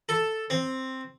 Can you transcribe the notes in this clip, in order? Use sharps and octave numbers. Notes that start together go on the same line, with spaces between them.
A4
C4